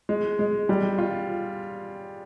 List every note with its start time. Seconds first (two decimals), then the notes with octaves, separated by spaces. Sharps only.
0.09 G#3
0.39 G#3
0.69 G3
0.98 F4